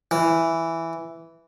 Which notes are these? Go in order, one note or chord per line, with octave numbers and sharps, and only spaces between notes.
E3